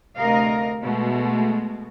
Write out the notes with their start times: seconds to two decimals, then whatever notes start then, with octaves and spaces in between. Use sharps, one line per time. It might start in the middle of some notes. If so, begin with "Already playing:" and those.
0.17 D2 C3 A#4 D#5 F5
0.83 B2 G#3 A3